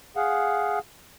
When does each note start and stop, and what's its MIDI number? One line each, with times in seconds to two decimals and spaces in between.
0.16 0.79 68
0.16 0.79 77
0.16 0.79 78